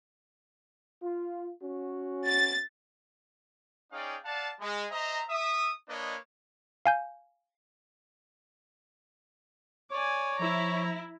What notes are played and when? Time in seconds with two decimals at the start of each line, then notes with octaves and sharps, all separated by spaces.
1.03 F4
1.63 C#4 F#4
2.27 A6
3.92 C#4 D#4 G#4 D5 F5 G5
4.25 D5 F5 F#5 A5
4.60 G#3
4.91 C5 D#5 E5 A#5
5.30 E5 D#6
5.89 A#3 D4 B4 C#5 D#5
6.86 F5 G#5 G6
9.91 C#5 D5 G#5
10.39 F3 E4 A#5